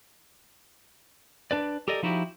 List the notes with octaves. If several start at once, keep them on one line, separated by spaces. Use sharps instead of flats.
D4 B4 D5
G4 A4 A#4 D5 D#5
F3 D#4 E4 F#4 G4